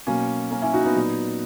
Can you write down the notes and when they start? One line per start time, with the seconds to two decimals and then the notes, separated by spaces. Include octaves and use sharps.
0.07 B2 F#3 A#3 C#4
0.51 A#3 C#4
0.62 C#4 E4
0.73 D#4 F#4
0.84 B3 D#4
0.95 A#2 F#3